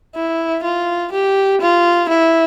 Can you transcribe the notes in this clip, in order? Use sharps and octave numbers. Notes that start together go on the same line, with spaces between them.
E4
F4
G4
F4
E4